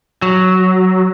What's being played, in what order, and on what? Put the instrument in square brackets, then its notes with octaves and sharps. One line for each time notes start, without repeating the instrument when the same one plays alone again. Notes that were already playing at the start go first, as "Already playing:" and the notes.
[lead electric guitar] F#3